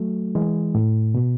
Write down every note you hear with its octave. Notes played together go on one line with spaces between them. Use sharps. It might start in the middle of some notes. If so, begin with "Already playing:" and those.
Already playing: F#3 A3
E3 G#3
A2
B2